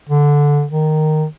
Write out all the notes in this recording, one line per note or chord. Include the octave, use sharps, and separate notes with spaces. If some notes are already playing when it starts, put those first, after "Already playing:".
D3
D#3